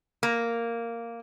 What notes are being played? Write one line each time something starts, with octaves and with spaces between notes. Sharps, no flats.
A#3